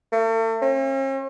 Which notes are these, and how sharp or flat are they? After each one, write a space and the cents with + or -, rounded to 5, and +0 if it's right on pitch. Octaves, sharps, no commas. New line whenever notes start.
A3 +40
C#4 -45